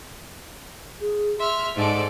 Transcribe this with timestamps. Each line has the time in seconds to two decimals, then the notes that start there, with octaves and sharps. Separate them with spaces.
1.01 G#4
1.39 E5 C6 F6
1.76 G#2 A4 D5